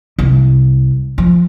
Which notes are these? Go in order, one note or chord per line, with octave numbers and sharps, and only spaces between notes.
C2
F3